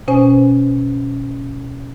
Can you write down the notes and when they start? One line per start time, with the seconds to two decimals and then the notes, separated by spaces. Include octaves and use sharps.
0.08 B2 C#4 C5 G#5